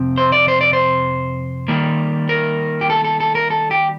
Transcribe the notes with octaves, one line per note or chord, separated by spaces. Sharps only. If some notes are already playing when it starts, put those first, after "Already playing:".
Already playing: F2 C3 F3 C4
C5
D5
C5
D5
C5
D#3 G3 A#3
A#4
G4
A4
A4
A4
A#4
A4
G4